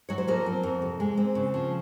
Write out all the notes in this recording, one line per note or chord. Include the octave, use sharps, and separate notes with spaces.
F#3 C#5
C5
F3 A#3 A#4
C4
F2
C3
G#3
C4
C#3
F3